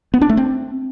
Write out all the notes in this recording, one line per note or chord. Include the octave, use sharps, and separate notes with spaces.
B3
D4
A3
C4